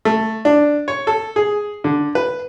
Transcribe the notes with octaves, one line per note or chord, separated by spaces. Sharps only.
A3
D4
C#5
A4
G#4
D3
B4